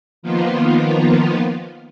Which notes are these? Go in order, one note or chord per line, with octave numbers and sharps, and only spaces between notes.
D#3 F3 A#3 B3 F4